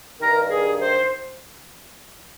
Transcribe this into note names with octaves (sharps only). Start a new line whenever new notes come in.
G2 D#3 A#4
G#4
C5